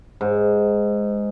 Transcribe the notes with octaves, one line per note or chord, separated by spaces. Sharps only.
G#2